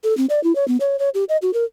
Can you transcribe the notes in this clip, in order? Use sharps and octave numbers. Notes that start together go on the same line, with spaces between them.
A4
C4
D5
E4
C#5
B3
C#5
C#5
G4
D#5
F#4
A#4